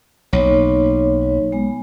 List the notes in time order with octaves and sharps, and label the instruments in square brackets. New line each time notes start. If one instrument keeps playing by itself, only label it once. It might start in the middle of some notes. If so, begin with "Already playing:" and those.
[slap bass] B1 [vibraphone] A#3 D#4 C#5
[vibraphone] G#3 B3 G#5